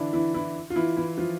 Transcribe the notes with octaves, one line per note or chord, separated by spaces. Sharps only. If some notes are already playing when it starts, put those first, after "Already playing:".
Already playing: D3 E3 D4 E4
E3 E4
E3 E4
F4
E3 E4
E3 E4
F3 F4